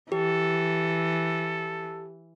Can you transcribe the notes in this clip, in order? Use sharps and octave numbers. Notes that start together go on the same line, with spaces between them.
E3 G4 A4